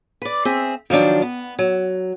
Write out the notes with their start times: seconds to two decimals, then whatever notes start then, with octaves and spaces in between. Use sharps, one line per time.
0.22 B4 D5
0.45 C4 G#4 E5
0.90 D#3 F3 F#3 D4
1.22 B3
1.59 F#3